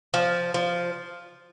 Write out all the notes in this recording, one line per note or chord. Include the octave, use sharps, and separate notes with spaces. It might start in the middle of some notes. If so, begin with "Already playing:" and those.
F3
F3